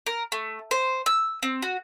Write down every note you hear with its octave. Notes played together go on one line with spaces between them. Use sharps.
A#4
A3
C5
E6
C4
F#4